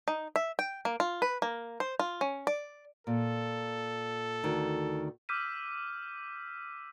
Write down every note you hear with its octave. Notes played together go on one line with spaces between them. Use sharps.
D#4
E5
G5
A#3
F4
B4
A#3
C5
F4
C#4
D5
A#2 A4
D2 D#3
D6 E6 F6 G6 B6 D#7